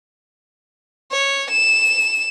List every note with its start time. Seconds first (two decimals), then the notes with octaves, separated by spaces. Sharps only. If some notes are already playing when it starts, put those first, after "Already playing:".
1.12 C#5
1.50 E7